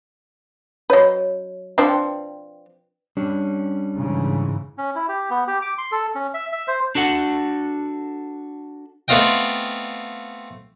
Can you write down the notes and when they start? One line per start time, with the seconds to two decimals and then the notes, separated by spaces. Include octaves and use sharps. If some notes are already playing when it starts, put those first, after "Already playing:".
0.90 F#3 C#4 B4 C#5 D#5
1.78 F3 C4 D4 B4 G5
3.17 G3 C#4 D4
3.94 G#2 C#3 E3
4.78 C#4
4.95 E4
5.09 G4
5.30 B3
5.48 G4
5.62 D6
5.78 C6
5.92 A4
6.15 C#4
6.34 E5
6.52 E5
6.68 C5
6.95 D4 F#4 A4 F#5
9.08 A3 B3 C4 F4 D#5 G5